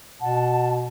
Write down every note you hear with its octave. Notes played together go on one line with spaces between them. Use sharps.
B2 F#5 A5